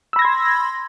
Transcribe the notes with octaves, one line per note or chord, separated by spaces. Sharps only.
B5 C6 E6 G#6 A#6